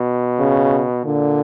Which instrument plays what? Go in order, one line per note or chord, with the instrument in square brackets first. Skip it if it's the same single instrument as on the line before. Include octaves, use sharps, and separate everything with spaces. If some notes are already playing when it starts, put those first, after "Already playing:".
Already playing: [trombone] B2
[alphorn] C#3
[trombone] A#2 [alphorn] D3